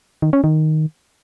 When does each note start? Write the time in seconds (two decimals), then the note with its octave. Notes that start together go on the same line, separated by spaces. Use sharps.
0.22 D#3
0.33 C#4
0.44 D#3